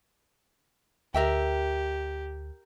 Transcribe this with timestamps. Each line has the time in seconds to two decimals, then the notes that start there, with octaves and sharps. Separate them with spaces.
1.14 D2 G4 A#4 E5 G5